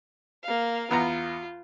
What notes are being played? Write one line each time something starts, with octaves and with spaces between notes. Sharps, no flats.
A#3 F5
E2 B3 F4 A#5